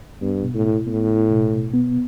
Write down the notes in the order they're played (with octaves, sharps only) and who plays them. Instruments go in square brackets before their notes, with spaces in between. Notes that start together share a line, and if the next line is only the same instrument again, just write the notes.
[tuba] G2 [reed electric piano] B3
[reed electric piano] B2
[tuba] A2
[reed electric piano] E4
[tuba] A2 [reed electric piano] B3
[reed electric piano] E4
B2
B2
B3